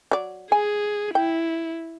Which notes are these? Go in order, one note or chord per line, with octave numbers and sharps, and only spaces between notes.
F#3 D5
G#4 G#5
E4 G5